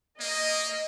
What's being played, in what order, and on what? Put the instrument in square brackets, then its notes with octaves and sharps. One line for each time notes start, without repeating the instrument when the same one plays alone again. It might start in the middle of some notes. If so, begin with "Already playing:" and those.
[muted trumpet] A#3 [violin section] D#5